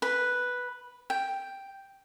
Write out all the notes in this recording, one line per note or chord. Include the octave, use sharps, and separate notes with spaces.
B4
G5